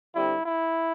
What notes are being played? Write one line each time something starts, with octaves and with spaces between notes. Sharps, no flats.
D3 G3 C4 E4
E4